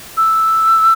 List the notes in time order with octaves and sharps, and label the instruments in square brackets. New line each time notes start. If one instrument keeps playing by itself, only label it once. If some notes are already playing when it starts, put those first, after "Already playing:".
[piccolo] E6